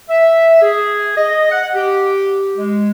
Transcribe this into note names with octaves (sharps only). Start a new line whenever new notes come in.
E5
G#4
D#5
F#5
G4
G#3